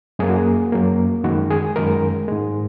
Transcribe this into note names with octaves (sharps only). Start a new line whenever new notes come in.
F#2 F#3 A#3 G#4
F#4
G#4
F#2 F#3 A#3
F#2 D#3 G#3 F#4
G#4
F#2 D#3 G#3 A#4
G#2 G#3